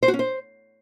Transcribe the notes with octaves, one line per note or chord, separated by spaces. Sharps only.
C5
F#4
C#4
C5